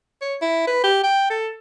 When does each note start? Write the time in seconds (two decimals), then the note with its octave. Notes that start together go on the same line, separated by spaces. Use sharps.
0.22 C#5
0.42 E4
0.67 B4
0.84 G4
1.04 G5
1.30 A4